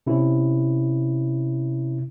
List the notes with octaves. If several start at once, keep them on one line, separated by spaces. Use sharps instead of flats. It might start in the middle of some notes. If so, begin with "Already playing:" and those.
C3 C#4 E4